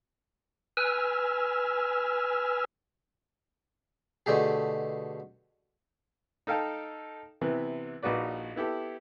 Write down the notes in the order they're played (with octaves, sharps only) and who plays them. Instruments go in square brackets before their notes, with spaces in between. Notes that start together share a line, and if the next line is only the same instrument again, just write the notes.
[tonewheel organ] B4 G#5 E6 F6
[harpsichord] B2 D3 A3 G4 G#4
[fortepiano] D#4 A4 F5 G5 A5
C3 E3 B3
A#1 D#4 F#4 B4 D5
B3 E4 G4 A4